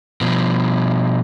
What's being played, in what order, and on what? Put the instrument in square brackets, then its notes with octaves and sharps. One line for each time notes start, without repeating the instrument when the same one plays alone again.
[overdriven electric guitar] B2 F3